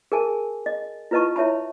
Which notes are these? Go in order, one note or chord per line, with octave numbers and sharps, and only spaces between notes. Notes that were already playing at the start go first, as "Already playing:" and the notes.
G#4 A#4 G#5 A5
D#5
E4 F4 B4 D#5 A5 C#6
E4 C#5 E5 A5 B5